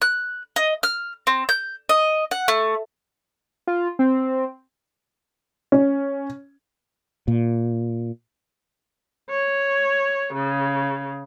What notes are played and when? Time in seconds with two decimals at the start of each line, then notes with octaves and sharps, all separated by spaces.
0.02 F#6
0.56 D#5
0.83 F6
1.27 C4
1.49 G6
1.89 D#5
2.31 F#5
2.48 A3
3.67 F4
3.99 C4
5.72 C#4
7.28 A#2
9.30 C#5
10.34 C#3